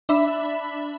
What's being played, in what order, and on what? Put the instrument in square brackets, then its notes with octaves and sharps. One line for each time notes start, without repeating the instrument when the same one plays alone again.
[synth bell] D4 E5 B5